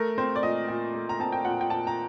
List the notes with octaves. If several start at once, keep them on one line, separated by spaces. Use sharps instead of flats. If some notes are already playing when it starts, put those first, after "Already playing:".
Already playing: A3 A#4
C4 C5
D5
A#2 D#5
A#2
A3
A#5
C4 A5
G5
A#2 F#5
G5
A#2 A5
A#5